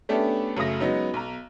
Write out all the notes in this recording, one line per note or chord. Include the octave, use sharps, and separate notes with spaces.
A3 B3 C#4 D4 G4 A4
F#2 C#3 A3 D#6 A#6
F#3 G#3 B3 C#4 D#4
B1 A#5